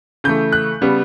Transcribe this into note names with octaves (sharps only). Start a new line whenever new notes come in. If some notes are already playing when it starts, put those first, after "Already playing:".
C#3 E3 A3 G6
F#6
C#3 G3 B3